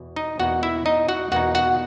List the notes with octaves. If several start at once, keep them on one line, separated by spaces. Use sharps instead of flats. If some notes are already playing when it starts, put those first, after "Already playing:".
Already playing: E2 B2
D#4 D#5
E2 B2 A#3 D#4 F#4 F#5
E4 E5
D#4 D#5
F#4 F#5
E2 B2 A#3 D#4 F#4 F#5
F#4 F#5